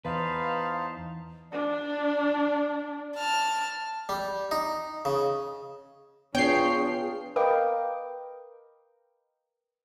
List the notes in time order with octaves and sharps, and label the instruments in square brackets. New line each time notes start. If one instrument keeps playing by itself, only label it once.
[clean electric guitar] E2 [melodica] D#4 C5 A5 [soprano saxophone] B4 [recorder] F5
[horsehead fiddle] D4 [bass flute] D5
[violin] A5 F6
[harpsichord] G3
D#4
C#3
[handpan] B3 F4 [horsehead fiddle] D4 G#4 [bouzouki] C#5 [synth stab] G5 C7
[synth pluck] A#4 B4 D#5 F5 G5 D6